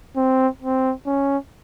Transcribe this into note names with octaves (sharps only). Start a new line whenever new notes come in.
C4
C4
C#4